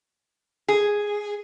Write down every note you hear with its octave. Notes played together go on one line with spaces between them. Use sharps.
G#4